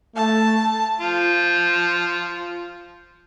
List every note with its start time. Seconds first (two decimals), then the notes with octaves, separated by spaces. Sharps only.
0.16 A3 A5
1.01 F3 F4